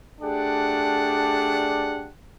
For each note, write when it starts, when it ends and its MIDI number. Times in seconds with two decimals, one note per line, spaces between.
0.21 2.08 57
0.21 2.08 62
0.21 2.08 67
0.21 2.08 68
0.21 2.08 74
0.21 2.08 78